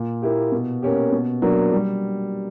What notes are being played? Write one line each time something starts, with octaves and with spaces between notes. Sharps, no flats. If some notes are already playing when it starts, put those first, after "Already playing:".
Already playing: A#2
A#3 E4 G4
B2
A#3 C#4 G4
B2
F#3 A#3 D4
G3